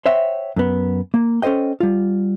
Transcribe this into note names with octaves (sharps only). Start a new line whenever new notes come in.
C5 C#5 E5 F#5 G5
F#2 B3
A#3
C#4 A4 C5 D#5 G5
G3 F4